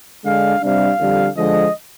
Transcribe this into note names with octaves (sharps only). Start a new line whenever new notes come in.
D3 G#3 D4 F5
C3 G3 D4 F5
F2 D3 G3
D3 F3 G#3 D#5